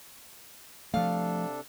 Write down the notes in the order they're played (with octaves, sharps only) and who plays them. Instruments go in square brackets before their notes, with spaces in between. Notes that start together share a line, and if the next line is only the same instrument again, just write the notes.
[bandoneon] C3 D4 A4 [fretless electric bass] F3 A3 [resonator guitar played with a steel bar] F5